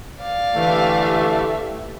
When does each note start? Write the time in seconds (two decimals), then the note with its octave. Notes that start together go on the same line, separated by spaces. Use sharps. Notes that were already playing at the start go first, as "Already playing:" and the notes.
0.22 D5 F5
0.55 D3 E3 A3 G4 A4 E5